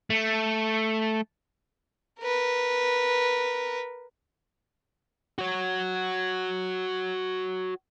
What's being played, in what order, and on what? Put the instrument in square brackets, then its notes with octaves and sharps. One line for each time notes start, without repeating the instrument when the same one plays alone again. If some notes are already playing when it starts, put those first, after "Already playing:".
[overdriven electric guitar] A3
[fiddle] A#4 B4
[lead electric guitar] F#4 C#5